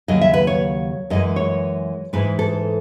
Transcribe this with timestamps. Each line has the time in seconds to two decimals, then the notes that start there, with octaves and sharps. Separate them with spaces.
0.08 D#2 C#3 F#3 D#5
0.21 E5
0.34 B4
0.47 C#5
1.10 F#2 E3 G#3 D#5
1.36 C#5
2.13 G#2 E3 G#3 B4
2.39 A4